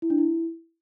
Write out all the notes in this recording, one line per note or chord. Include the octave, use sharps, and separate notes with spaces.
E4
D4
E4